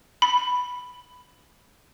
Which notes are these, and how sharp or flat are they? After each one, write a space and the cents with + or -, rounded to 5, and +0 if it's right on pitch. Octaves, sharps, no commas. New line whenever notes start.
B5 +0